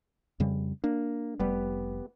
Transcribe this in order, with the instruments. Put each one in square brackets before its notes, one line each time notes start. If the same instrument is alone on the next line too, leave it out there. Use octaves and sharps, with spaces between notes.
[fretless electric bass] F2 C#3 G3
[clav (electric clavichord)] A#3 [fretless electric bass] D4
[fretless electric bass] F1 G3 [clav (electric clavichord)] B3 G4 B4